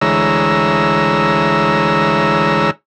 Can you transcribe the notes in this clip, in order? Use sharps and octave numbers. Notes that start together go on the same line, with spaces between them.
D2 E3 G#3 C#5 A#5 E6